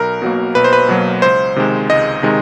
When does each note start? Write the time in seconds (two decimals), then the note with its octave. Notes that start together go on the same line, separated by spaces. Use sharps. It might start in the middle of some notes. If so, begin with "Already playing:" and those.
Already playing: B1 A#4
0.22 B2 F#3 A#3
0.55 B1 B4
0.64 C5
0.73 B4
0.88 B2 F#3 A#3
1.22 C#2 C5
1.56 C3 D#3 G#3
1.89 C#2 D#5
2.23 C3 D#3 G#3